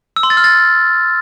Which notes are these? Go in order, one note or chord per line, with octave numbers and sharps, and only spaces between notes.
E6
C6
A6
F6
A6